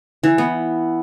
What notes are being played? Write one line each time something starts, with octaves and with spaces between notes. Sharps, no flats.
E3
B3